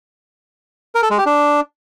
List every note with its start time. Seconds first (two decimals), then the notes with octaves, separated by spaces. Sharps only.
0.95 A#4
1.03 A4
1.10 G#3
1.18 G4
1.26 D4